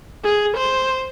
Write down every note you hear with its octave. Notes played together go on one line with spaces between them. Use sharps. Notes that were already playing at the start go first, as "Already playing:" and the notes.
G#4
C5